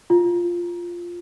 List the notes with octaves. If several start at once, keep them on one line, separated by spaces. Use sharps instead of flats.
F4